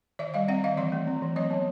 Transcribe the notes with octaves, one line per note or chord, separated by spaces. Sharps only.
D#3 D5 E5
G3 D#5 F5
C4 E5 F#5
D#3 D#5 F5
E3 D5 E5
A3
C4
E3
F#3 C#5 D#5
B3